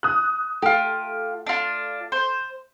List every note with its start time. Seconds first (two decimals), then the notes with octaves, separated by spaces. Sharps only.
0.03 D#6 F#6
0.62 A3 F4 G4
1.46 D4 F4
2.12 C5